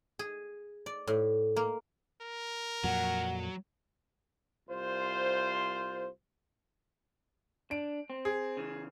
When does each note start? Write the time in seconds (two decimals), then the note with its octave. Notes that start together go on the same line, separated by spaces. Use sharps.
0.19 G#4
0.86 D5
1.07 A2
1.56 A#3
2.22 A#4
2.84 F2 A#2 F#3 F#5
4.69 C2 F4 C5
7.71 D4 D7
8.10 C4
8.25 G#4
8.57 C#3 E3